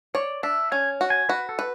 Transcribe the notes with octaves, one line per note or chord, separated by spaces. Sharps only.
C#5 D5
D4 E5
C#4 G#5
F#4
G#5
F#4 B4
A4
B4